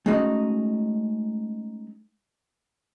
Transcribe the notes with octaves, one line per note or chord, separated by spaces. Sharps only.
G#3 A3 C#4 D#4 F#4 D#5